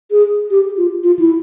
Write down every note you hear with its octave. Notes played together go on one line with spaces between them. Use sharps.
G#4
G4
F4
F4
E4